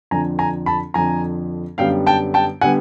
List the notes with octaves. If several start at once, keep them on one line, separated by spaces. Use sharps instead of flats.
F2 D3 F3 G#5 A#5
G#5 A#5
A5 B5
F2 D3 F3 G#5 A#5
F#2 D3 G3 B3 F5 G5
G5 A5
G5 A5
D3 G3 B3 F#5 G#5